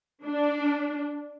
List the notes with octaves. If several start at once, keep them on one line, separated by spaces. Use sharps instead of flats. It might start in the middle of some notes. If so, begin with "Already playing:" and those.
D4